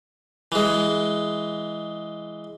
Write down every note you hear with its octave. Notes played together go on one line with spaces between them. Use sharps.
E3 G#3